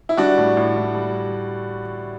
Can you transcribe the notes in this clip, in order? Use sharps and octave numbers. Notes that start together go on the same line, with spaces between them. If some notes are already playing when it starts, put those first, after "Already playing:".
E4
G3 D4 F#4
A2
A2
A2
G3